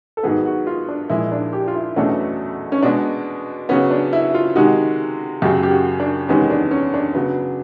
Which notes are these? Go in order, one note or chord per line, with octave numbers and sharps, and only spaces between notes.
A4
G#2 D#3 F#3 B3 G#4
F#4
F4
D4
A#2 F3 G#3 E4
D4
G4
F4
E4
E2 B2 F#3 A3 C#4 D4
C#4
B2 G#3 B3 D4
C#3 F#3 B3 C#4
D4
E4
F4
C3 D#3 G#3 F#4
F#2 C#3 F#3 G4
G4
F#4
D4
E2 C3 D#3 G#3 B3 C#4
D4
C#4
D4
C#3 F#3 B3